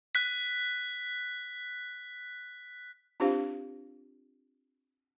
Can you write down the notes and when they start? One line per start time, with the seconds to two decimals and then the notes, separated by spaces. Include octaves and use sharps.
0.15 F#6 B6
3.20 C4 D4 F4 G4 C5 F5